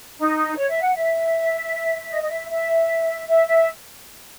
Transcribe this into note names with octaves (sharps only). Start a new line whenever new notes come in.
D#4
C#5
E5
F#5
E5
D#5
D#5
E5
E5
E5
E5